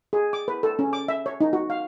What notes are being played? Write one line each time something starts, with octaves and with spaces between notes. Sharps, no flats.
G#4
D6
B4
A4
C#4
D6
E5
C#5
D#4
F#4
F5